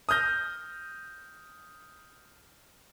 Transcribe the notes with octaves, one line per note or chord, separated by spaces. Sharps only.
D#6 F6 G6 A#6